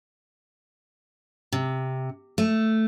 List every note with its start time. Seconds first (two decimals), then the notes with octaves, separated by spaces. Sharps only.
1.52 C3
2.38 A3